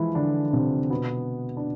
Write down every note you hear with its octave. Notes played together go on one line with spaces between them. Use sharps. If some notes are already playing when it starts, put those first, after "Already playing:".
Already playing: E3 F3 G#3 E4
D3 D4
C3 C4
B2 B3
D4